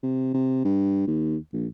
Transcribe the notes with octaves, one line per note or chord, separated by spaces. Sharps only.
C3
C3
G2
D#2
A#1